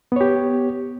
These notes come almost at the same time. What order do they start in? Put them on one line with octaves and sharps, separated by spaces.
B3 C#5 G4